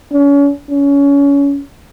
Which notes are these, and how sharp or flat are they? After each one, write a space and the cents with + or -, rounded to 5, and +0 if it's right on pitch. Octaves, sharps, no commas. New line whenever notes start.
C#4 +35
C#4 +25